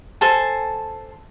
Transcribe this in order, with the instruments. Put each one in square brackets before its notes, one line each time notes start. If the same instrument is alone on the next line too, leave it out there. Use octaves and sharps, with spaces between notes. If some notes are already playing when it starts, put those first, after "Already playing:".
[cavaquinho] A4 C5 G#5 A5